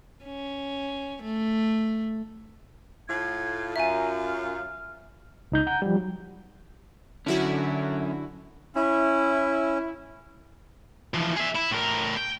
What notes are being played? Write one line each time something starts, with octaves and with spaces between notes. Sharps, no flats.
C#4
A3
A2 F4 G#6
F#2 F4 E5 G#5 A#5
F6
C#2 D#4 G6
F#5 A#5 G6
F3 G3
F#3
D3 F#3 C#4 E4 F#4
C#4 E4
E3 F3
G#4 E5
E4
A2 A#4
G5